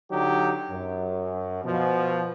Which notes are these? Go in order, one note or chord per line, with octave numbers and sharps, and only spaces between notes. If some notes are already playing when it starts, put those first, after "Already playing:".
D3 F#3 D#4 G4
F#2
B2 F3